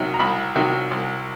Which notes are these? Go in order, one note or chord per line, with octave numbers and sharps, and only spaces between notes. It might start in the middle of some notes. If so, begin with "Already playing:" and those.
Already playing: C2 C3 D#3 F#3
A#5
C2 B5
C3 D#3 F#3
C2